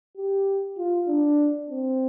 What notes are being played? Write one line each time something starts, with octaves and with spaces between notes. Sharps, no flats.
G4
F4
D4
C4